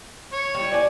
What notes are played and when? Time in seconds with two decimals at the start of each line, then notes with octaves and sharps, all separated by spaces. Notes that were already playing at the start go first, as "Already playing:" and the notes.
0.33 C#5
0.55 G3 E4
0.72 D5 G#5